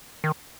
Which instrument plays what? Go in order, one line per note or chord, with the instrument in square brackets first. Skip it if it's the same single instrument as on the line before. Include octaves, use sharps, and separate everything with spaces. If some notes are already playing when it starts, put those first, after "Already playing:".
[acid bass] D#3